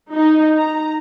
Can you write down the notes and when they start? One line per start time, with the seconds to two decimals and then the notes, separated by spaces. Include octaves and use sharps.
0.13 D#4
0.57 A#5